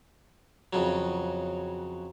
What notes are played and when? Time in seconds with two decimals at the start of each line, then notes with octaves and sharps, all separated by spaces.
0.73 F2 C#3 F#3